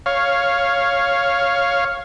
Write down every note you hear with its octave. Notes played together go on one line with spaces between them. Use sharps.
C#5 F5